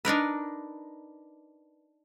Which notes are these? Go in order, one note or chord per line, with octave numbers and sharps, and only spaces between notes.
D4 D#4 A#4 B4